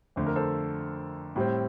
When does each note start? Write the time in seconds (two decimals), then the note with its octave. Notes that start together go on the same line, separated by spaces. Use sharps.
0.16 F2 D3 A3 C5
0.26 A#4
0.36 A4 C5
1.36 A2 G3 C4